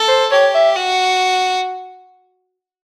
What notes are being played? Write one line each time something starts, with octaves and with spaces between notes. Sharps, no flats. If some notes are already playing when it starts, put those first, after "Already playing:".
Already playing: A4
C5
G4 C#5
E5
F#4